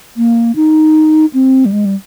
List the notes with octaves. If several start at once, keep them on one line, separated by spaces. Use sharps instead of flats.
A#3
D#4
C4
G3
G#3
G3